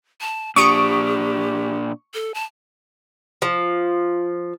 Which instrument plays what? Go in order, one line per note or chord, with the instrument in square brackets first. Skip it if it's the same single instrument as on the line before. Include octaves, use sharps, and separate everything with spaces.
[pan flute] A5
[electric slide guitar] A#2 D4 [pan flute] G4 [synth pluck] C#6 D#6 D7
[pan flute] A4
A5
[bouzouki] F3